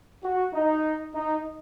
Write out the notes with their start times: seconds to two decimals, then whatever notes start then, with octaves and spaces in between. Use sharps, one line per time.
0.24 F#4
0.54 D#4
1.15 D#4